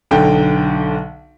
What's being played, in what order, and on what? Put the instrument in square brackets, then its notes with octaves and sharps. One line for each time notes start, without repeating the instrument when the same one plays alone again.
[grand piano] B1 D3 G5